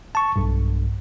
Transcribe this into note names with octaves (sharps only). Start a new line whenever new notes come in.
A5 C#6
B1 G2